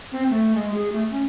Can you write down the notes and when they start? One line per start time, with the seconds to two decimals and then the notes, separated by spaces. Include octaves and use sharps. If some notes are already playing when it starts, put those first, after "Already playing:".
0.12 C4
0.30 A3
0.55 G#3
0.74 G#4
0.92 A3
1.11 C#4